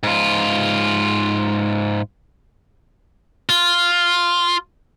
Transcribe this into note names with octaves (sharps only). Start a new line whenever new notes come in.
G#2 F4
F4